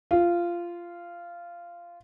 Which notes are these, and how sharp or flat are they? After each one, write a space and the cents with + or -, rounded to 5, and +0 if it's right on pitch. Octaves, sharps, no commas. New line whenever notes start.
F4 -15